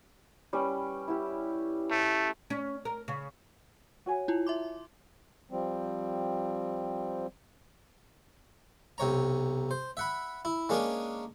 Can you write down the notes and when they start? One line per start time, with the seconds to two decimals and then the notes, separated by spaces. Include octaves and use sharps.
0.53 G3 C#4 B4
1.08 E4 G4
1.91 A3
2.50 C#4
2.85 A#4
3.08 C#3
4.06 F#4 C#5 G#5
4.28 E4 F4
4.47 E5 C6 D6
5.51 F3 G3 C4
8.98 B1 C3 C#5 A#5
9.71 C5
9.97 E5 F#5 B5
10.45 E4
10.69 G#3 A#3 C#4 D4 G#4 A#4